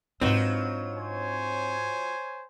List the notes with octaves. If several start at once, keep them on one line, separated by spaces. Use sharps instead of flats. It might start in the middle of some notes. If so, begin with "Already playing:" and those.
G#2 F#3 C4 D4 D#4 F4 B4
C5 C#5 G#5